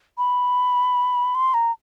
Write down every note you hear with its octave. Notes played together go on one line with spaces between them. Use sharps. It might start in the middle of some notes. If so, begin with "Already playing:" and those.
B5
C6
A#5